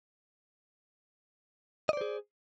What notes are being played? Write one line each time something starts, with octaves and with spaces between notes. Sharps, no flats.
G#4 C5 D5 D#5